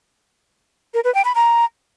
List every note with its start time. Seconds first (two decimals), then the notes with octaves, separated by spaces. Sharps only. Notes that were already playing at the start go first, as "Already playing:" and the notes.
0.94 A#4
1.04 B4
1.15 G5
1.25 B5
1.35 A#5